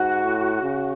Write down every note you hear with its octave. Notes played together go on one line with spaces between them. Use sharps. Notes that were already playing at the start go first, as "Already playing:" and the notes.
Already playing: G#2 F#4
A2
C#3